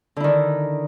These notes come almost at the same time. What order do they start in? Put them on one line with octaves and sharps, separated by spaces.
D3 E4 D#3 D4